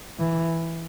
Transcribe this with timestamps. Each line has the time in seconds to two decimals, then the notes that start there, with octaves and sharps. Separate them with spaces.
0.19 E3